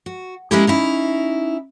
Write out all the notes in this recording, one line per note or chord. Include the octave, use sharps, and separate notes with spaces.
F#4
G#3 A#3 C#4 E4 G4 G#4
C#4 D#4 E4